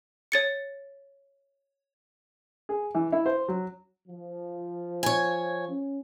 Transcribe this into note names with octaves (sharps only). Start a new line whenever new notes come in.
C#5 A6 C#7
G#4
E3
E4
C5
F#3
F3
C#5 G#5
C#4